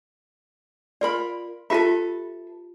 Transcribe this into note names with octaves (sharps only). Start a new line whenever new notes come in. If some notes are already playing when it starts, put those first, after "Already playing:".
F4 A#4 D5 B5
F4 G4 A4 B4 E5 B5